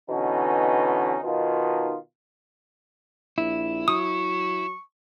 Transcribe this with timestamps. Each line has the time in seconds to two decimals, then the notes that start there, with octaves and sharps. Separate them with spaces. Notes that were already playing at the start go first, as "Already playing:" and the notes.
0.10 B2 D3 E3 C#4 D#4
1.24 B2 D#3 D#4 F4
3.38 A#1 E4
3.88 F#3 C#6 D#6